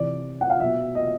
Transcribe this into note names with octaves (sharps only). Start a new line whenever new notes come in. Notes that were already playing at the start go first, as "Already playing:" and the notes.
Already playing: C3 E3 D5
F#5
F5
B2 F#3 E5
D#5